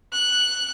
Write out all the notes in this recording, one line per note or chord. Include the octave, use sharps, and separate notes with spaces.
F#6